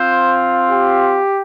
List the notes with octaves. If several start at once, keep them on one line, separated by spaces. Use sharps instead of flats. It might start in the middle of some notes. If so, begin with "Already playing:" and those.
Already playing: C4 F4 C5
G4